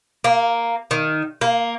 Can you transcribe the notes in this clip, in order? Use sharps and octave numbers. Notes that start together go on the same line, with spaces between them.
A#3
D#3
A#3